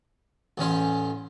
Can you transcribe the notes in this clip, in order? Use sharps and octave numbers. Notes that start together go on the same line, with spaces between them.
A1 E2 C#4 C5